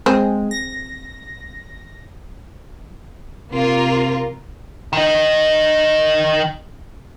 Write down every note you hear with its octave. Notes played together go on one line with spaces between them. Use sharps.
G#3 C4 G#4
A#6
C3 A#3 F4 A#4
D#3 D#5